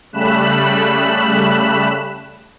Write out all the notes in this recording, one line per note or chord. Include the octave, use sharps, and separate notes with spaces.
C#3 G3 A3 B5 F#6 E7